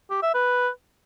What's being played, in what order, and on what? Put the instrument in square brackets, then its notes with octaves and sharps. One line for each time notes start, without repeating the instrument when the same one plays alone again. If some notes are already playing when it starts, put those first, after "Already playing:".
[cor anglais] G4
E5
B4